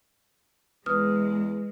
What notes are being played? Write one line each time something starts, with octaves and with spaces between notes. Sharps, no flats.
E2 G#3 B4 D#6 F6